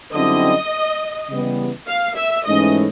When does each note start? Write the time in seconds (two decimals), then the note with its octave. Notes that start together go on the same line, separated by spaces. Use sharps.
0.12 F#2 D3 G3 C4 E4 D#5
1.29 C#3 E3 G3 B3
1.88 F5
2.16 E5
2.45 G#2 E3 A3 C#4 D#5